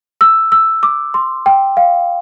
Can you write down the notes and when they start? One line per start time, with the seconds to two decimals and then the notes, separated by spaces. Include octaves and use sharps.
0.21 E6
0.52 E6
0.83 D6
1.14 C6
1.46 G5
1.77 F5